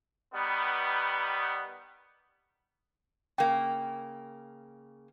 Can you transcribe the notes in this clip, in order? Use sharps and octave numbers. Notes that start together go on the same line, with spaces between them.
D#3 G3 B3
C#3 A#3 G5